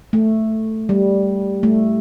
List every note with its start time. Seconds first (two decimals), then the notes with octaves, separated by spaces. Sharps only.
0.13 A3
0.89 G3
1.63 A3